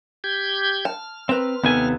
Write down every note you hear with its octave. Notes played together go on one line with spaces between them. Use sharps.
G4 G6 G#6
A5 F6
C4 B4 A#5
D#2 C3 B3 D#4 A4 G#5